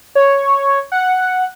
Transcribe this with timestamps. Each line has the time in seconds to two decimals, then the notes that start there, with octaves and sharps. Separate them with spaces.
0.15 C#5
0.92 F#5